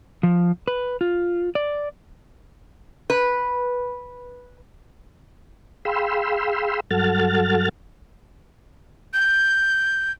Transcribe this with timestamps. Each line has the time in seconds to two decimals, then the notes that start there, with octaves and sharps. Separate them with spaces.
0.23 F3
0.68 B4
1.01 F4
1.55 D5
3.10 B4
5.85 G#4 F5 G5 B5 C6 E6
6.91 G2 F#3 A4 F#5 F6 A6
9.14 G6